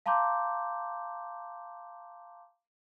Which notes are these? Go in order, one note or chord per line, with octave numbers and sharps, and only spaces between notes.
F5 A5 A#5 C6 D6 G6